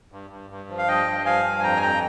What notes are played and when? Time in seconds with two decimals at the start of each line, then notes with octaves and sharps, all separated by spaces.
0.12 G2
0.30 G2
0.50 G2
0.69 F3
0.78 F5
0.87 G2 D#5 G5
1.06 G2
1.25 F3 F5 G#5
1.44 G2
1.59 G#5
1.63 F2 G5 A#5
1.76 G#5
1.82 F2 G5 A#5